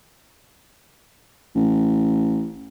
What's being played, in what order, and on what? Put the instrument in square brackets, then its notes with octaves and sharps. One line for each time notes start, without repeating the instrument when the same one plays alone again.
[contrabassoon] A1